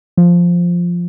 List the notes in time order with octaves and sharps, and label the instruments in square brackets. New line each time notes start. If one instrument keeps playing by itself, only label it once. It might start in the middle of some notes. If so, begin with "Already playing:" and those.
[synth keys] F3